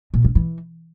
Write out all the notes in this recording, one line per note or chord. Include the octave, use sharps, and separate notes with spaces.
A#2
C#3
E3